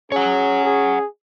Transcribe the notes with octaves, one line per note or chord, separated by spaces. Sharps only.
C#4 G#4 C#5 F#5
G#4